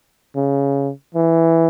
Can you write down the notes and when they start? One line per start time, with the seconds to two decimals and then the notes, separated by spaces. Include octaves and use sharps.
0.36 C#3
1.15 E3